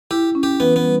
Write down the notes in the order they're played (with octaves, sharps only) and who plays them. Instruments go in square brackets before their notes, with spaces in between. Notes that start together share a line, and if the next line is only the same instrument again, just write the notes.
[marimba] E4 [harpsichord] G4
[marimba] C#4
[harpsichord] G4
[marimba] E3 [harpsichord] B3
[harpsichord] B3
[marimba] G3